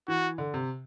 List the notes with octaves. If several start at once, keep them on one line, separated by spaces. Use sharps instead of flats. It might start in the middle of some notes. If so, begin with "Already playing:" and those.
E3 F#4
D3
C3